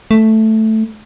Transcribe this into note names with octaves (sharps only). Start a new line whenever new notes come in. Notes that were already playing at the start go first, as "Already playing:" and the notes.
A3